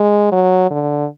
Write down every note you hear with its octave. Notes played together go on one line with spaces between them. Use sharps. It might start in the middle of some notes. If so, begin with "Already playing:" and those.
Already playing: G#3
F#3
D3